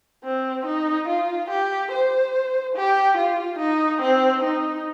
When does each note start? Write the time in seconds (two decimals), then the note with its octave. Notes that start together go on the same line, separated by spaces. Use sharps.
0.24 C4
0.66 D#4
1.08 F4
1.50 G4
1.91 C5
2.76 G4
3.17 F4
3.59 D#4
4.01 C4
4.43 D#4